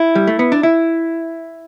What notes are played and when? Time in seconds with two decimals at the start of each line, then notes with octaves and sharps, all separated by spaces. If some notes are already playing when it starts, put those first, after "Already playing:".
Already playing: E4
0.15 G3
0.27 A3
0.39 B3
0.52 D4
0.63 E4